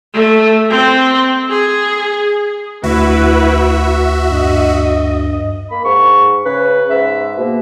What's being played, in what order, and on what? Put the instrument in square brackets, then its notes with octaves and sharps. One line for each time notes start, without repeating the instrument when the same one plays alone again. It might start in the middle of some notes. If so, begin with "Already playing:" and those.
[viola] A3
C4
G#4
[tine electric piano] D2 [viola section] E4 B4 [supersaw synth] F#4 E5
[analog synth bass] G2 [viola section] D#5
[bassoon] A#3 [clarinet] B5
[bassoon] G#2 [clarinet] C#6
[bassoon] C#3 [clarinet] B4
[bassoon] G#2 [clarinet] E5
[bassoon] B2 [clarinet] A#3